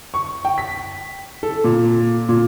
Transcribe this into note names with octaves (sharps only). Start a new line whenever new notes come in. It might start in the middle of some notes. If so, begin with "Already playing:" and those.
C#6
G5
B6
A4
A#2
A#2